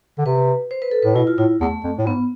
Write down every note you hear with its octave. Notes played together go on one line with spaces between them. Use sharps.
D3
C3 B4
C5
B4
A4
A2 B4
B2 E4
F4
A2 E4
E2 A3
F2
A2
G#2 B3